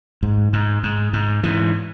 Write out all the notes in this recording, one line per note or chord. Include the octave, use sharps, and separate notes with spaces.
G#2
G#2
G#2
G#2
G#2 E3